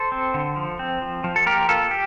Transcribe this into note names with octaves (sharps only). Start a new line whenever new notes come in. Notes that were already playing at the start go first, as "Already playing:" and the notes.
Already playing: A4 C5
C4
D3
F3
C4
F3
F3
A4
A#3 G4 A#4
A#3 F4 A4
G4